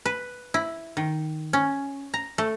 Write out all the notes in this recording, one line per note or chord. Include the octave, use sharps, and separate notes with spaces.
B4
E4
D#3
C#4
A#5
A3